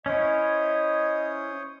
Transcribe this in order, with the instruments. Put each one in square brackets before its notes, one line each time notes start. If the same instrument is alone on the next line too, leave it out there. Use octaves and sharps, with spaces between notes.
[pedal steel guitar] C#4 E4 [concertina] C5 C#5 D#6 [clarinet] D#5